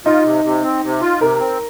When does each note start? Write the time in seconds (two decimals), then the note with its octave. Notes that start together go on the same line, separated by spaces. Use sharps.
0.05 D#4 F4
0.24 C3
0.44 C3
0.63 C4
0.83 C3
1.01 F4
1.21 C3 A#4
1.40 C4